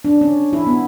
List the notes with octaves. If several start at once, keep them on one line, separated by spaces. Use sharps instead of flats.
D4
C#4
E4
B3